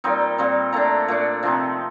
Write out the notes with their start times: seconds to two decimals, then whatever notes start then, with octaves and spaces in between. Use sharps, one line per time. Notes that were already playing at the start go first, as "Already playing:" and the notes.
0.04 A#2 G3 C4 D#4 G5
0.38 A#2 G3 C4 D#4
0.72 A#2 A3 D4 A#5
1.08 A#2 A3 D4
1.43 C3 F3 C4 D#4